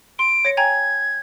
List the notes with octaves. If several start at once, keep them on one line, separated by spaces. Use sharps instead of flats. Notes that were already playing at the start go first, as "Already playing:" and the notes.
C6 D7
C#5 A#6 C#7
G5 G#5 A#5 G#6